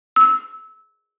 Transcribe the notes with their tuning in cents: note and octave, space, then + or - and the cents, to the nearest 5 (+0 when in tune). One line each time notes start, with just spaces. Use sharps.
E6 -20